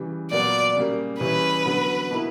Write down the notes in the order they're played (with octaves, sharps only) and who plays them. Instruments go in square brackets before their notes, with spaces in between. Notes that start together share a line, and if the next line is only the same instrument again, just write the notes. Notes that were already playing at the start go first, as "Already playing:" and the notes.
Already playing: [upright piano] C#3 E3 G3
[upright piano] A#2 F#3 B3 [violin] D5
[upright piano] C#3 G3 A#3
[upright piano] C#3 E3 G3 C#4 E4 [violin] B4
[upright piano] D3 F#3 B3
B2 A#3 E4